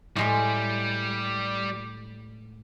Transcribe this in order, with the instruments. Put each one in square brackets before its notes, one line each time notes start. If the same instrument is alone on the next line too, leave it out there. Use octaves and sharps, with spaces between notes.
[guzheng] A2 G#3 C6 [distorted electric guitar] G3